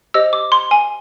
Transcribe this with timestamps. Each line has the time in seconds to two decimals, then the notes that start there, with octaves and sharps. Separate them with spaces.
0.14 G4 C5 D#5 E6
0.33 D6
0.52 C6
0.71 G#5